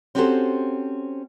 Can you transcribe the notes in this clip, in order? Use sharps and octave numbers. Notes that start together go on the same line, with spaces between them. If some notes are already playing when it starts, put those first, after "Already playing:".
C4 C#4 F#4 G4 A4 C5